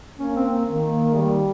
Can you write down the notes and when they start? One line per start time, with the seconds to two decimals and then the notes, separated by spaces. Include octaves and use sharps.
0.19 A#3 C#4
0.35 C4
0.66 D#3 A#3
1.14 G3